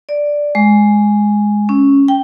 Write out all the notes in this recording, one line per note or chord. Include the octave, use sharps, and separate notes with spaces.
D5
G#3
C#4
G5